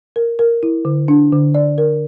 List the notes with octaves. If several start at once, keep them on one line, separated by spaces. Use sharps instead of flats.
A#4
A#4
E4
D3
D4
D3
D5
A#4